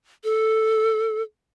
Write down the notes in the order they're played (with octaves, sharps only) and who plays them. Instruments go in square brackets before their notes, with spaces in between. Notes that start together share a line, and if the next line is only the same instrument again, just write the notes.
[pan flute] A4